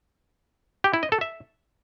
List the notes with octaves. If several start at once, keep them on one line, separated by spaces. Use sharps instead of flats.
G4
E4
D#5
A4
E5